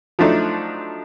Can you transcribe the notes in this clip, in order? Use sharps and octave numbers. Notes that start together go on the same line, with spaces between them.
F3 F#3 A3 D4 D#4